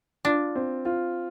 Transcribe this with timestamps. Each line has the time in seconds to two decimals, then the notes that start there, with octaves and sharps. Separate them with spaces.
0.25 D4 F4
0.55 C4
0.85 F4